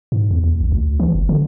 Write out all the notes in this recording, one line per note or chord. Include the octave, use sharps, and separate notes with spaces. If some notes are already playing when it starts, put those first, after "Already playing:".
G#2
E2
D#2
A1
D2
E3
F#1
D3